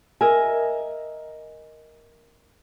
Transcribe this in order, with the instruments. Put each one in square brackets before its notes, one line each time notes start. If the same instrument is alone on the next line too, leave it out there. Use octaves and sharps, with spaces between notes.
[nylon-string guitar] A#4 D#5 E5 G#5